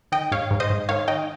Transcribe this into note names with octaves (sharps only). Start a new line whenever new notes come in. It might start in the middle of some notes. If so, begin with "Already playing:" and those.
D#3 D#5 G5
G#2 C#5 F5
G#2
C5 D#5
G#2
D#3 C#5 F5
D#3 D#5 G5